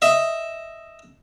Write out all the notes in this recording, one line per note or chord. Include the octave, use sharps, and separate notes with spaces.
D#5 E5